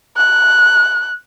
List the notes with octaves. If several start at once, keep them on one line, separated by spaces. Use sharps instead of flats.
F#6